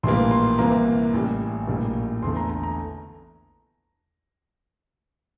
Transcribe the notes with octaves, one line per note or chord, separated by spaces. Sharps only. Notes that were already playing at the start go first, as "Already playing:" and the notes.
A#1 A2 E3 G3 A#3 C6
C6
C2 C3 E3 A#3 A#5
A1 A2 G3
A#1 A2 G3 A#3
E2 D3 A3 C6
A#5
A#5
A#5